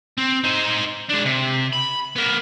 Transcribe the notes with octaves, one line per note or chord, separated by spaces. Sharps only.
C4
D#4 C5
G#3 D4
C3
B5
B3 A#4